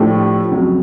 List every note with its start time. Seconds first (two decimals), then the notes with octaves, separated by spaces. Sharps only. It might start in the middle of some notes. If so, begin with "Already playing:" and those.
Already playing: A2 F3 A3 D4 G4
0.51 F2 C#3 F#3